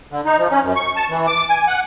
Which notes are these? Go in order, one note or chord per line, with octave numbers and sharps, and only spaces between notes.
D3
D#4
F3
C#4
F#2
C#6
A5
E3
D6
G#5
F#5